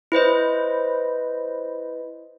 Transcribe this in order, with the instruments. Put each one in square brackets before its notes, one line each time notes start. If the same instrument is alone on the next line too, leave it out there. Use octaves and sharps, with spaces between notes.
[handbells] E4 B4 C5 D#5